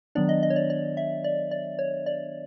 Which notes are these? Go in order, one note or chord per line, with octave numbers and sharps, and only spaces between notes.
D#3 F#3 B3 D4 D5
D#5
D#5
C#5
D5
D5
E5
D5
D5
C#5
D5